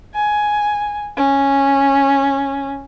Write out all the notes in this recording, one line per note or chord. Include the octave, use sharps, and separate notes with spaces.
G#5
C#4